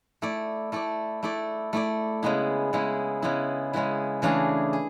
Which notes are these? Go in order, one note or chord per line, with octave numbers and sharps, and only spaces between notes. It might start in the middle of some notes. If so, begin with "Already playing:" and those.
A3 E4 A4 D5
A3 E4 A4 D5
A3 E4 A4 D5
A3 E4 A4 D5
C#3 G#3 B3 E4
C#3 G#3 B3 E4
C#3 G#3 B3 E4
C#3 G#3 B3 E4
C#3 E3 A3 D4 G#4
G#4